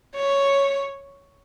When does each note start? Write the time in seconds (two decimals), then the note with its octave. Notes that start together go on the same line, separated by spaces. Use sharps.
0.15 C#5